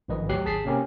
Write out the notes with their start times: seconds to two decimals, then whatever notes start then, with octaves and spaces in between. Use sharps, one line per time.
0.08 A1 G#2 D#3 F3 B4 D#5
0.29 D2 F#3 G4 F#6 C7
0.45 G#1 G#4 A5 B6 C7
0.64 C3 A#3 C4 C#4 G4 A#4